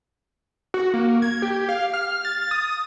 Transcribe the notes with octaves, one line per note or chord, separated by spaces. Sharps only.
F#4
A#3
G#6
G4
F5
F6
A6
D#6